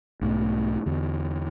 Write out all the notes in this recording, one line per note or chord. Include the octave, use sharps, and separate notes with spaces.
B1 G#2 E3 A3
E2 D3